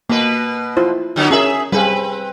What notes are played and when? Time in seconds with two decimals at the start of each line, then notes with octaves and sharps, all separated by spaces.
0.09 B2 A#3 B4
0.77 E4 F4 C5
1.16 D3 F#3 B3
1.31 C#4 F#4 G#4 A#4 E5
1.72 G3 C4 G#4 B4 F5